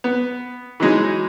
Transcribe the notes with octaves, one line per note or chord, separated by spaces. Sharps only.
B3
E3 F#3 G#3 D#4